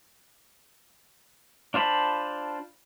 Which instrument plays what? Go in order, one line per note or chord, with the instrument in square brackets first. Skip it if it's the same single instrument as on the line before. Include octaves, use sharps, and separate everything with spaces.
[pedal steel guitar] D4 F4 C5 A5 B5